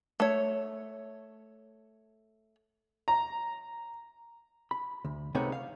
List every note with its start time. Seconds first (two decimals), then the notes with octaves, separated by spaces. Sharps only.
0.20 A3 C#5
3.08 A#5
4.71 B5
5.05 D2
5.35 C#2 C3 A3 B3 D#4 C#5
5.52 F5